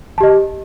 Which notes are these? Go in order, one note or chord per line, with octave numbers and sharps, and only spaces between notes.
G4 D#5 A5